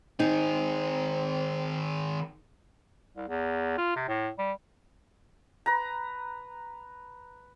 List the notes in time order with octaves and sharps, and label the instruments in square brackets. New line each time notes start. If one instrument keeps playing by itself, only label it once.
[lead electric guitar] D#3 G#4 [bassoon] C4 [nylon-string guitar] D#4
[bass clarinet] C2
E2
F4
C3
A2
G3
[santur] B4 A#5